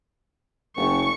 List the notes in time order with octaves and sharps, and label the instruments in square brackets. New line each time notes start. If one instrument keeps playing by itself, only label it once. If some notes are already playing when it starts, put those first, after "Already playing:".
[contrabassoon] F#1 [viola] C#6